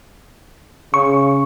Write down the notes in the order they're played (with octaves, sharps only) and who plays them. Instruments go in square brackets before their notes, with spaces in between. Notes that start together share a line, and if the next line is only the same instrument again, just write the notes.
[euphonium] C#3 [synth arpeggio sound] C#6